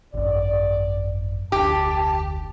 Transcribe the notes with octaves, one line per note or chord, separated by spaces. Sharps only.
G#1 F#2 D5
F1 D2 G4 A5